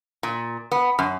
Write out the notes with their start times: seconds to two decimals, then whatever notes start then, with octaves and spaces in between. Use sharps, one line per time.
0.23 A#2
0.72 B3
0.99 F#2